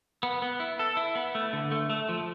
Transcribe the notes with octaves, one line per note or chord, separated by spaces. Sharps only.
B3
B3
E4
A4
E4
B3
A3
D3
A3
A3
F3